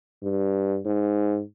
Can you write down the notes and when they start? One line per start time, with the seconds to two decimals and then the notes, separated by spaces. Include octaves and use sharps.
0.23 G2
0.85 G#2